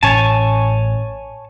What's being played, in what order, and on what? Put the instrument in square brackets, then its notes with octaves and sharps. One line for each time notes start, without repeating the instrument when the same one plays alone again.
[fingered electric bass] A1 A2 C#4 [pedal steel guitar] C#5 G#5 A5